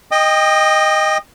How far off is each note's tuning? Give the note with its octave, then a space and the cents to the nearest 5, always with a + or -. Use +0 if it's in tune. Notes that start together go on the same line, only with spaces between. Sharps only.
D#5 +0 G5 +20 D#6 -30